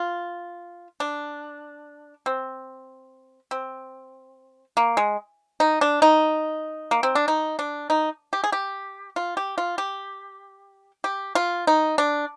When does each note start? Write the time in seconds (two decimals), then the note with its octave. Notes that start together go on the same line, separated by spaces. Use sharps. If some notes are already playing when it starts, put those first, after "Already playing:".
Already playing: F4
1.00 D4
2.26 C4
3.51 C4
4.77 A#3
4.97 G#3
5.60 D#4
5.81 D4
6.02 D#4
6.91 A#3
7.03 C4
7.15 D4
7.28 D#4
7.59 D4
7.90 D#4
8.33 G4
8.44 G#4
8.52 G4
9.16 F4
9.37 G4
9.58 F4
9.78 G4
11.04 G4
11.35 F4
11.67 D#4
11.98 D4